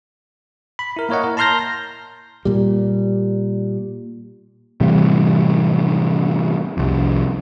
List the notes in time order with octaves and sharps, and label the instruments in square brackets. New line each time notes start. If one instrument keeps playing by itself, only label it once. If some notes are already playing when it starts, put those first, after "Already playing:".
[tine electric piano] B5
E4 A#4
A#3 E4 A#4 C#5 D#5 F#5
A#4
A5 A#5 C6 F6 G6 A#6
[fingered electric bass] A#2 G3
[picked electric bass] A2 C3 E3 G3
C2 F2